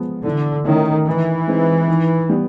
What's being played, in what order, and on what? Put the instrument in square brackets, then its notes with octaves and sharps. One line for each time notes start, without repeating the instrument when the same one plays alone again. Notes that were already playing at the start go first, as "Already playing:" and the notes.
Already playing: [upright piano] F3 G#3 B3
[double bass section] D3 [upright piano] E3
[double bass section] D#3 [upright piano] A3 C#4 E4
[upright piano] D#3 [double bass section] E3
[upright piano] G#3 C4 D#4
D#3
G3 B3